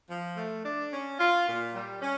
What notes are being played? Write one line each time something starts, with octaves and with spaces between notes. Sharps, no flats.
F3
A3
D4
C#4
F4
A#2
G3
C#4